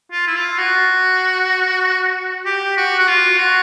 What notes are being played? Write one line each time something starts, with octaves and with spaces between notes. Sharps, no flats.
F4
E4
F4
F#4
G4
F#4
F#4
F4
F#4